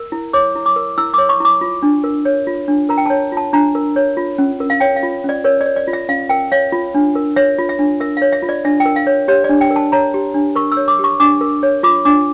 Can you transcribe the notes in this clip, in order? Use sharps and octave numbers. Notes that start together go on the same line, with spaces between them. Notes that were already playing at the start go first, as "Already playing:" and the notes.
Already playing: A#4
E4
C#5 D6
E4
D6
A#4
E4 E6
C#5 D6
C#6
E4 D6
F4
D4
A#4
C#5
F4
D4
A#4 A#5
G5
C#5 A5
F4 A5
D4 A#5
A#4
C#5
F4
C#4
A#4
F5
C#5 G5
F5
F4
C#4 D5
A#4 C#5
D5
C#5
D5
F4
E5
C#4 F5
A#4 G5
C#5 F5
F4
D4
A#4
C#5 E5
F4
E5
D4
A#4 E5
C#5 F5
E5
F4
D5
D4 E5
G5
A#4
F5
C#5
G4 C#5
D4 D5
G5
A#4
A5
C#5 A#5
G4
D4
A#4 C#6
E6
C#5
D6
G4 C#6
D4 D6
A#4
C#5
F4 D6
D4 D6